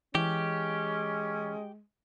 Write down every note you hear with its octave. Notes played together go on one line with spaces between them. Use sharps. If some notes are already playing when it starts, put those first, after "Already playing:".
E3 G#3 C#4 G4